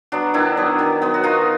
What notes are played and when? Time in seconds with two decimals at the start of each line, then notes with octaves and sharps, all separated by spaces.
0.12 F#3 B3 D4
0.34 D#3 D4 E4
0.57 F#3 B3
0.79 D#3
1.02 F#3 B3
1.14 F#4
1.24 D#3 D#4 F4